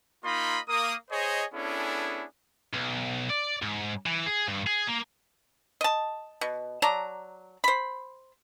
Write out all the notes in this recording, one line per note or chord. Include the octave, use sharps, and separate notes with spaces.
A#3 D#4 F4 D#5 B5 C6
A#3 D#6
G#4 C5 C#5 D#5
B3 C#4 D4 E4 G#4 A4
B1
D5
G#2
E3
G#4
G2
G#4
A#3
D#5 A5
B2
F#3 D5 A5 A#5
C5 B5